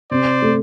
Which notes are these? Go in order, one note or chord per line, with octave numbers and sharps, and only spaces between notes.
C3 C5 D5
A3